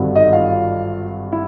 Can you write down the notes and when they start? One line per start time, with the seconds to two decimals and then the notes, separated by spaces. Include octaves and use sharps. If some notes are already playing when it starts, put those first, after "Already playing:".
Already playing: G#1 G2 D3 F#3
0.15 D#4 D#5
0.33 F4 F5
1.32 E4